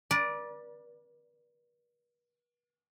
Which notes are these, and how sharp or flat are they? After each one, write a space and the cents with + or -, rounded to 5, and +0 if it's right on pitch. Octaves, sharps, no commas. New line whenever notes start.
B4 -45 D5 +0